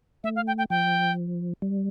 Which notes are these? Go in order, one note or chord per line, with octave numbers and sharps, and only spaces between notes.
A3 E5
F5
G5
G5
F3 G5
G3